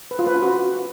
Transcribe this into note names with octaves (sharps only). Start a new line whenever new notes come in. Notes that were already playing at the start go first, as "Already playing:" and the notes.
B4
F4
B4
C#4
F#4